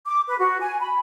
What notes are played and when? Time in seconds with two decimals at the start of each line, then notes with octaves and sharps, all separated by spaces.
0.06 D6
0.27 B4
0.38 F#4
0.61 G#5
0.80 B5